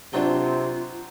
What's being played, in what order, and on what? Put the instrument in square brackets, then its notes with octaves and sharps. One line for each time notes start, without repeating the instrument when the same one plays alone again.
[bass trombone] C3 [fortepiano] F#3 C4 D4 [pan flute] F4